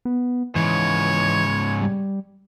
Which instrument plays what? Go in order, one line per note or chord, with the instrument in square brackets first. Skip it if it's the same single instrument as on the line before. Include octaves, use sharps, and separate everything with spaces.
[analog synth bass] B3
[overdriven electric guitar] G#2 C#3 [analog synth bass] E3 [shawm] C#5
[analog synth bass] G3